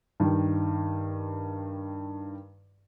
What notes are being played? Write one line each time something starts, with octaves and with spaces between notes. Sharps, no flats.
G2 D#3